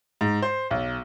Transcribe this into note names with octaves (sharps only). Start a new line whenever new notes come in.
G#2
C5
B1